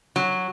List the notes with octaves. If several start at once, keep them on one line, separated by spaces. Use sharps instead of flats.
F#3